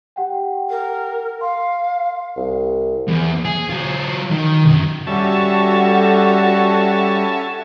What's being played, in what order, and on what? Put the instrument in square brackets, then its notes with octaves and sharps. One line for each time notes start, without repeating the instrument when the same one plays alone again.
[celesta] G4 F#5 G5
[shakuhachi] A#4
[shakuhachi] F5 [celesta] C6
[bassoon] C2
[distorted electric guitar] E2
G#4
F#3 F4
D#3
C#2 F#2
[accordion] G3 [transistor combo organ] C#4 E5 A5 [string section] F#4 A4